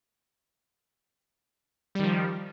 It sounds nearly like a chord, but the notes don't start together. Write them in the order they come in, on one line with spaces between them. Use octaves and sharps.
G3 D#3 F3